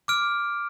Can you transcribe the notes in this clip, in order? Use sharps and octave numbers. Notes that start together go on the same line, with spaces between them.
D6 F6 D7